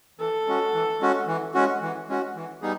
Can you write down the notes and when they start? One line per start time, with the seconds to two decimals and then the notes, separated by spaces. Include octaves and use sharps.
0.19 E3 A4
0.47 G#3 C#4 F#4
0.74 E3
1.00 G#3 C#4 F#4
1.27 E3
1.54 G#3 C#4 F#4
1.82 E3
2.09 G#3 C#4 F#4
2.35 E3
2.62 G3 B3 D#4 G#4